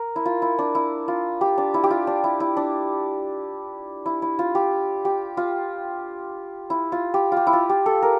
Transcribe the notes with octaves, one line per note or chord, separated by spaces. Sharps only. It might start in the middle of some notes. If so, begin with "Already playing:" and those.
Already playing: A#4
E4
F4
E4
D4
E4
F4
G4
D4
E4
G4
F4
D4
E4
E4
D4
E4
E4
F4
G4
G4
F4
E4
F4
G4
F4 G4
E4
F4
G4
A4
A#4